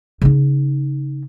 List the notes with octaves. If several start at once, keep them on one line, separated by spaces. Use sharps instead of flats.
C#3 D#4